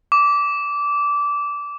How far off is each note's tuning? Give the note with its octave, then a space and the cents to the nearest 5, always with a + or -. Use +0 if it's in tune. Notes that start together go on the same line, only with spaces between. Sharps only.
D6 -20